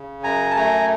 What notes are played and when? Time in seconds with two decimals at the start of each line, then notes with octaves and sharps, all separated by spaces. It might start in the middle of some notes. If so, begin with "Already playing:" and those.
Already playing: C#3
0.23 F#2 G#5 A#5
0.51 A5
0.56 A3 G#5 A#5